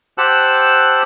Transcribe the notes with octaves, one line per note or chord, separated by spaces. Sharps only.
G4 C5 F#5 A5 E6 F#6